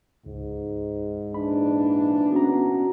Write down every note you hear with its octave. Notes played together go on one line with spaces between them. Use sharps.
C#2 G#2
A#2 E3 D4 B5
B3 C#4 F#4 A#5